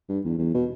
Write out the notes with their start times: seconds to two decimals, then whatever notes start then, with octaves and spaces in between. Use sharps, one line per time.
0.09 G2
0.25 E2
0.39 E2
0.54 B2